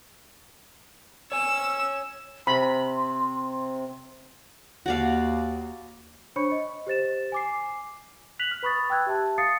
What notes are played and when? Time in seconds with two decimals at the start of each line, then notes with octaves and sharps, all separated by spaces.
1.32 C#5 G#5 E6
2.47 C3 B5 C6
4.86 D#2 F#4 D5 F5
6.36 D4 C5 C#5 B5 C#6 C#7
6.52 D#5
6.87 G4 C5 A6 E7
7.32 G#5 D6 C7
8.39 F#6 B6 F7 F#7
8.51 F6
8.63 B4 B5 C#6 D#6 A6
8.90 G5 E6 F#6 G#6
9.07 G4 E5 A5
9.38 F5 D#6 A6 C7 C#7